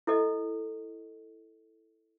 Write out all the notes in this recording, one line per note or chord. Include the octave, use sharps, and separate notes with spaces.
E4 A4 D#5